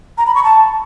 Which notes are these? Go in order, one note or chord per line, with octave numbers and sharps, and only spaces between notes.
A#5
B5
C#6
A5